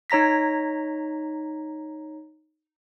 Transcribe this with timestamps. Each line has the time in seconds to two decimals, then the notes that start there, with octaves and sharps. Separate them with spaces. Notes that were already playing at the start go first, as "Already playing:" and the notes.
0.10 D#4 C#5 A#5 A#6 B6